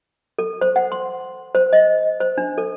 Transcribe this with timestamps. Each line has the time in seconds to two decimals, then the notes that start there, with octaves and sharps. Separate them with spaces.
0.39 A4
0.61 C5
0.76 F#5
0.92 C6
1.55 C5
1.73 D#5
2.20 C5
2.38 D4
2.58 A4